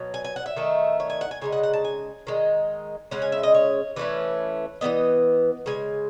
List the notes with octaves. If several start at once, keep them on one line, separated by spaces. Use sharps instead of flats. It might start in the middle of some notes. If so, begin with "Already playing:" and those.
Already playing: B2 F#3
G#5
G#5
F#5
E5
D#3 A3 D#4
C#5
G#5
F#5
G#5
C#3 G#3 D#4 G#5
F#5
F#5
A5
G#5
D#3 G#3 D#4
C#3 G#3 C#4 F#5
G#5
E5
D#5
C#5
E3 A3 C#4 B4
E3 G#3 B3 D#5
C#3 G#3 G#5